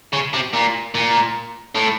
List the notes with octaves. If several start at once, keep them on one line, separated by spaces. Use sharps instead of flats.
C#3
C3
A#2
A#2
A2